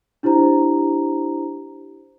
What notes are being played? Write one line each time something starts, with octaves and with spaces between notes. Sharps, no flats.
D4 E4 G4 C5 A#5